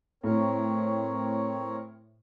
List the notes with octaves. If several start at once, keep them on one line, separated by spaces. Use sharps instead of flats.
A2 C4 A#4 C#5